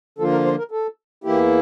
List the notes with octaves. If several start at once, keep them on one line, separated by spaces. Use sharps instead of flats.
D3 F3 A#3 F4 A4
A#4
C5
A#4
A4
E2 E3 A#3 E4 G4